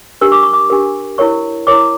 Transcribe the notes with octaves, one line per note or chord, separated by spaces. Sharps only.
D4 G4 A#4 E6
D6
C#6
D6
D4 G4 A#4
E4 A#4 C#5 C#6
E4 A#4 C#5 D6